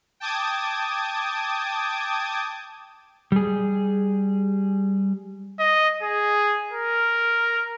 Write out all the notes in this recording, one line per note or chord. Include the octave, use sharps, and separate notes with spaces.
G5 A5 D6 D#6 G#6
G3 G#4
D#5
G#4
A#4